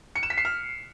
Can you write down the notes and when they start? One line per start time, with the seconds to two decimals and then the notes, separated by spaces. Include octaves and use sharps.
0.15 C#7
0.23 E7
0.30 B6
0.38 C7
0.45 F6